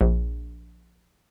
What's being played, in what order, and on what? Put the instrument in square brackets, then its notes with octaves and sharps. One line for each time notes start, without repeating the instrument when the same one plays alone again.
[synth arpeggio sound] A#1